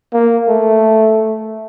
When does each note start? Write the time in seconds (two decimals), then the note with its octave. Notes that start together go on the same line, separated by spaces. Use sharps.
0.13 A#3
0.48 A3